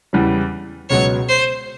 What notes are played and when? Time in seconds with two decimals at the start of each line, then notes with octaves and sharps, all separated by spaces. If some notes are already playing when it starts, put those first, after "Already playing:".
0.13 E2 C#3 E3 G3
0.90 C#2 B2 F#3 B3 C#5
1.29 C5